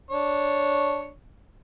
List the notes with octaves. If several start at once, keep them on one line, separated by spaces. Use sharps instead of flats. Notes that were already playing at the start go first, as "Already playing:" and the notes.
D4 C#5